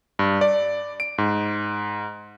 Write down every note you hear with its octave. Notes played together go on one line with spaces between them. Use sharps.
G2
D5
D7
G#2